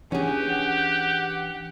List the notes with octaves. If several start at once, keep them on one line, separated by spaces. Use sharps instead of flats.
E3 C#4 D4 G4 G#4 F#5